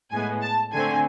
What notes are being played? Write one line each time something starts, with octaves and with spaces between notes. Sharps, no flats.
A2 G#3 B3 G#5
A5
D3 A3 C4 G#5